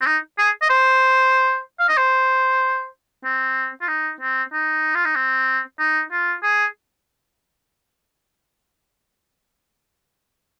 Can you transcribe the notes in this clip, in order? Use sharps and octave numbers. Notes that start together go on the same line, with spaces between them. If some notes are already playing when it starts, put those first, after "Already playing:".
C4
D#4
G#4
D#5
C5
F5
D#5
C5
C4
F4
D#4
C4
D#4
F4
D#4
C4
D#4
F4
G#4